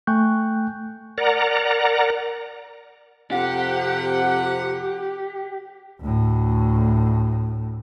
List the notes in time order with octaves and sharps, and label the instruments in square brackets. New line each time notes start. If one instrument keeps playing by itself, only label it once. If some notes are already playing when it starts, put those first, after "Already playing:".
[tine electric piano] A3 G5 G#5 C#6 F#6 G6
[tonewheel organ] A#4 D5 F#5 A#5
[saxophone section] F2 C3 F#5 [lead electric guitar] G4
[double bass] D2 A2